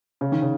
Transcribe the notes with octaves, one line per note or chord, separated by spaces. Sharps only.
C#3
D#3
C#3